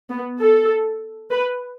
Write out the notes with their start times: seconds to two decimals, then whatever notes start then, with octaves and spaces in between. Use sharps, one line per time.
0.10 B3
0.41 A4
1.31 B4